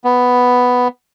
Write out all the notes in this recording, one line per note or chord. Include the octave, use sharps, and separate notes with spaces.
B3